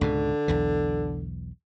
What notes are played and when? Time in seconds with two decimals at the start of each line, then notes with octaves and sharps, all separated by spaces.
0.01 C#2 G#2 B2 D3
0.48 B1 E2 E3